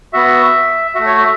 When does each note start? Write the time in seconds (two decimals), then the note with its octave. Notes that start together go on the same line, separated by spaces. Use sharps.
0.13 B3 F#4 E5
0.95 A3 F#4 E5
1.06 C#5
1.18 E5